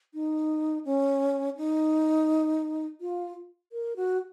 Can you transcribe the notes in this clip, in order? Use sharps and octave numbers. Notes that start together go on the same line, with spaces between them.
D#4
C#4
D#4
F4
A#4
F#4